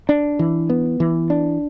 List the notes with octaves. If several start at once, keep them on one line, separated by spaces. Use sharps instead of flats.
D4
E3
B3
E3
D4